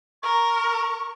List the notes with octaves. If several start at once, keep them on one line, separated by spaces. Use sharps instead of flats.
A#4 C#6